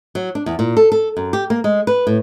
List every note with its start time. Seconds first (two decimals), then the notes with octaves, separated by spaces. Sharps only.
0.15 F#3
0.35 D4
0.46 E2
0.59 A#2
0.77 A4
0.92 A4
1.17 F#2
1.33 G4
1.50 A#3
1.64 G#3
1.87 B4
2.07 A2